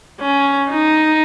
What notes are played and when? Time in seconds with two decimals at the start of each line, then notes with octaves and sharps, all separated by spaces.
0.21 C#4
0.71 D#4